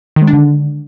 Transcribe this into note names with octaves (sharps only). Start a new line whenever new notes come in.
D#3
G#3
D4
D3